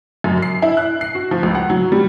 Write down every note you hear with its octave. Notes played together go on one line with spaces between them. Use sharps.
F#2
C7
E4
F#6
C7
F#4
F3
C#2
F#5
F#3
G3